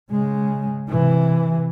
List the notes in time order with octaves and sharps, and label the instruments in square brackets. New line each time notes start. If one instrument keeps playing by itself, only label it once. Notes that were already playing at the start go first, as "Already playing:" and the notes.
[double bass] C#3 G#3
C3 E3